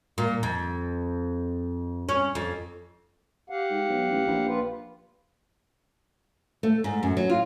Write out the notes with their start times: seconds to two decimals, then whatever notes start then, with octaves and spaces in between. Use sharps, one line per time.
0.18 A#2
0.43 F2
2.09 C#4
2.35 F2
3.50 G4 F5 F#5
3.70 G#2
3.89 B1
4.11 A1
4.27 A#1
4.46 F4 B4
6.63 A3
6.84 G#2
7.03 F#2
7.17 F#3
7.30 F4